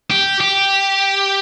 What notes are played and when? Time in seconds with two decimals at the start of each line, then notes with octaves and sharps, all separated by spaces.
0.10 G4
0.40 G4